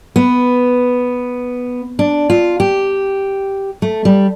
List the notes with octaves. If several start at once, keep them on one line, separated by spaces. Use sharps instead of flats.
B3
D4
F4
G4
A3
G3